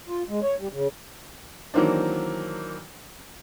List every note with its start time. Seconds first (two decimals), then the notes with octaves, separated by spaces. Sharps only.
0.08 F4
0.29 G#3
0.42 C#5
0.59 G3
0.73 C#3
1.74 D#3 E3 F#3 A#3 C4 D4